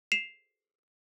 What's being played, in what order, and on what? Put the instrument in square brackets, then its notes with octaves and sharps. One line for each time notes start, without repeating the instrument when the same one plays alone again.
[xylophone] C7 E7 F7